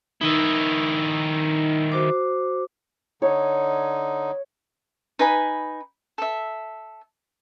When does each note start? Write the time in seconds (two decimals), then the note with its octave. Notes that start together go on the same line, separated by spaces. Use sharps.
0.21 D#3 D#4 E4 E6
1.92 F#4 C5 D6
3.22 D3 D#4 C#5
5.19 D#4 B4 G#5 B5
6.18 A4 E5